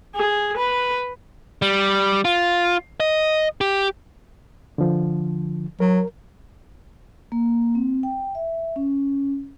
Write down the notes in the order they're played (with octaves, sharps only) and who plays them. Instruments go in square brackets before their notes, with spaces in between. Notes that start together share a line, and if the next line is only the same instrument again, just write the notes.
[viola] G#4
B4
[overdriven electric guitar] G3
F4
D#5
G4
[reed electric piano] D3 F3
[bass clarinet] F#3 [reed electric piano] A#4
[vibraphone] A#3
C4
G5
E5
C#4